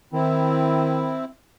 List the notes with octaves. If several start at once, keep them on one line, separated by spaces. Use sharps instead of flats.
D#3 C4 E4